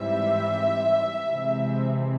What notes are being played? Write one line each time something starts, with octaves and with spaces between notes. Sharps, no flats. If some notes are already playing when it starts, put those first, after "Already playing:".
Already playing: G#2 E3 G3 C4 E5
C3 E3 G#3 C4